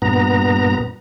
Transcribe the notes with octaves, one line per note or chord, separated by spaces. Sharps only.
G2 A#2 B3 A#5